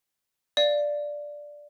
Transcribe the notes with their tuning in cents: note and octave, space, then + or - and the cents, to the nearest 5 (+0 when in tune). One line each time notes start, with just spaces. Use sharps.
D5 +0 F5 +0